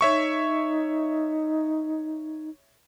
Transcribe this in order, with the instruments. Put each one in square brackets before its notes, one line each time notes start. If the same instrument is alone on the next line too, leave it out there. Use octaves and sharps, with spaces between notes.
[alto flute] D#4 [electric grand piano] C#5 E5 C#6